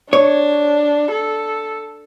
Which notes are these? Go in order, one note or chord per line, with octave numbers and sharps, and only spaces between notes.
D4 C#5
A4